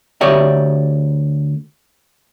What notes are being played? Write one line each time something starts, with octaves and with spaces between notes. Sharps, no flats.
D2 G4 C#5 D5 E5